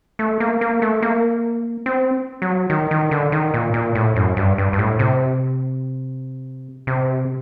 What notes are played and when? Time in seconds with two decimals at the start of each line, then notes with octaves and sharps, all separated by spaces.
0.19 A3
0.40 A#3
0.61 A#3
0.82 A3
1.02 A#3
1.86 C4
2.42 F#3
2.70 D#3
2.91 D#3
3.11 D3
3.32 D#3
3.54 A#2
3.74 A#2
3.95 A2
4.16 F#2
4.37 G2
4.58 G2
4.73 G2
4.79 A2
4.99 C3
6.87 C3